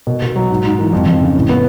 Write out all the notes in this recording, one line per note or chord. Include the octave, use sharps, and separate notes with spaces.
B2
B2
F#3
G#2
G#2
E3
F2
F2
C#3
A2
B3